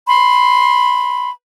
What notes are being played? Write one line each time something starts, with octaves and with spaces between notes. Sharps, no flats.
B5 C6